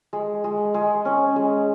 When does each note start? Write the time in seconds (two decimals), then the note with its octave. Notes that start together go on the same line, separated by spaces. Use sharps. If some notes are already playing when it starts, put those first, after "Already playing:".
0.13 G#3
0.44 G#3
0.74 G#3
1.05 C#4
1.36 G#3